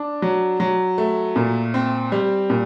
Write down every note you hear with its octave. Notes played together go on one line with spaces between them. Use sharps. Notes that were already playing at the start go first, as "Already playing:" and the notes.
Already playing: D4
F#3
F#3
A3
A#2
C4
G3
A#2